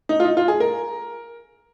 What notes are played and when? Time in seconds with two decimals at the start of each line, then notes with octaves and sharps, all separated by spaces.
0.09 D#4
0.20 F4
0.25 D#4
0.37 F4
0.48 G#4
0.60 A#4